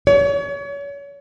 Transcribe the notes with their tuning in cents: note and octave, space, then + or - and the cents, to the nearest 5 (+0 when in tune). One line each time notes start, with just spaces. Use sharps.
C#5 +35